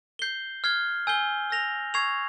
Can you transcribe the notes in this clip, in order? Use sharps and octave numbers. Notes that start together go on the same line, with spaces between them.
G6 C7 G7
F6 G#6 C7 G7
G#5 E6 G6 C7 G7
E6 A#6 F7
C#6 E6 G#6 C7 F7